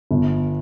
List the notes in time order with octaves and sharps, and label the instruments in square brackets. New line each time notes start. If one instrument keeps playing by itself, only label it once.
[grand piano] G1